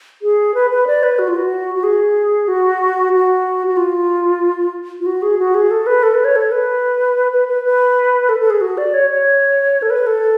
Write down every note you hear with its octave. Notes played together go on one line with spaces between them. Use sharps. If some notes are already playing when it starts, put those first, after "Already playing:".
G#4
B4
B4
D5
B4
F#4
F4
F#4
F#4
G#4
F#4
F#4
F#4
F4
F4
F#4
G#4
F#4
G#4
A4
B4
A4
B4
C#5
A4
B4
B4
B4
B4
A4
A4
G#4
F#4
D5
C#5
C#5
A4
B4
A4